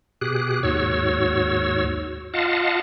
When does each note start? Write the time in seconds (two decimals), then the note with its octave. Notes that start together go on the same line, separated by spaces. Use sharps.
0.21 B2 G4 G#4 F#6
0.63 D#2 G#2 F#4 C#5 E6
2.34 F4 D#5 F5 F#5 A5